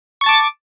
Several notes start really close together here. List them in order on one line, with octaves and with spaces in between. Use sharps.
C#6 A6 A5 D6